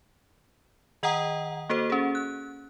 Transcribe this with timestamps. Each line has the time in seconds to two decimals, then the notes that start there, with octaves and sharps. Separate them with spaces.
1.03 D#3 D#5 F#5 G5 A#5 D#6
1.69 A#3 F#4 A4 C5
1.90 C#4 G#4
2.15 F#6